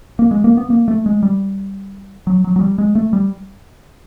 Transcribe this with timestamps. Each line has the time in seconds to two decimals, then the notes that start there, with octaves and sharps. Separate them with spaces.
0.19 A#3
0.31 G#3
0.44 A#3
0.57 B3
0.70 A#3
0.88 A3
1.06 G#3
1.23 G3
2.27 F#3
2.44 F#3
2.56 F#3
2.61 G3
2.78 G#3
2.95 A3
3.13 G3